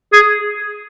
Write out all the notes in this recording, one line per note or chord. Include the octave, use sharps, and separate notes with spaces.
G#4